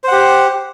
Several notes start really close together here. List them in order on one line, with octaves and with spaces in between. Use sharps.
C5 F#5 G4